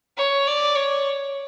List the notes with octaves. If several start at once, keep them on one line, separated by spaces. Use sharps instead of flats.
C#5
D5
C#5